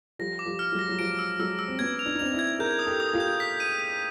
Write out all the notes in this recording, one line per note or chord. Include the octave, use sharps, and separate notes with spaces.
F3 G3 A#6
D6
F3 G3
F6
F#3 G#3
A#6
F#3
F3 G3 D7
E6
F#3 G#3 E6
E6
C4
B3 C#4 G#6
F7
D4
D#4
C4 D4 F7
D4 E4
G#6
G#4 A#4 G6
D#6
G4 A4
D#6
F4 G4
G6
B6
D#7
D#7